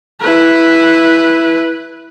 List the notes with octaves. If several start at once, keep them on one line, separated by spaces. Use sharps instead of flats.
E4 B4